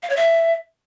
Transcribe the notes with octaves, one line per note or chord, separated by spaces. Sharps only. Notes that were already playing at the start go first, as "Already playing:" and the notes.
F5
C#5
E5